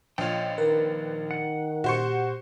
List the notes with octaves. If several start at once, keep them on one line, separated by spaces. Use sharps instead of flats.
A#1 F4 C#5 D#5 G5
D#3 A#4 B4
F#5
A#2 F#4 G4 C5 C#6 C#7